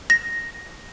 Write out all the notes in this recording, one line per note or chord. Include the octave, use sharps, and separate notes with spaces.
A#6